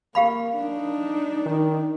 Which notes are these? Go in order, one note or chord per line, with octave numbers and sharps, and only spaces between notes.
A#3 G4 F5 B5
D4 D#4
D#3